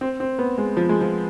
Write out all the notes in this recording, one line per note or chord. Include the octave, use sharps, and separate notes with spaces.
C4
C4
B3
G#3
F3
G#3
F3